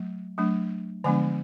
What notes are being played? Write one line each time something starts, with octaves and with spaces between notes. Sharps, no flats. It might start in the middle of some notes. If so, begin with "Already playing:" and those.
Already playing: F#3 A3
F#3 A3 D4
D3 F3 G#3 B3 D4 G#5